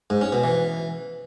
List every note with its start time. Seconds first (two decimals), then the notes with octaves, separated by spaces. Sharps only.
0.10 G#2
0.21 C#4
0.32 B2
0.44 E3